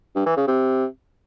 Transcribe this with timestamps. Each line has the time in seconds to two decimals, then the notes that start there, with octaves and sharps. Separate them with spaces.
0.15 G2
0.26 E3
0.37 C#3
0.48 C3